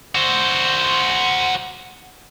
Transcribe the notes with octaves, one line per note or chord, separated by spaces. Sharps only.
F#4 C5